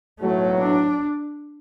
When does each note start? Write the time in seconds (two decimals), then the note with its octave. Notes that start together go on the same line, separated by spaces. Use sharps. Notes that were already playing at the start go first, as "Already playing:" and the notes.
0.20 B1 A2 F#3 A3
0.60 D4